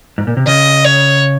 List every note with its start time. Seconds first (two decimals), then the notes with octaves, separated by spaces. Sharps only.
0.18 G#2
0.27 A#2
0.37 C3
0.47 C#3 D#5
0.85 C#5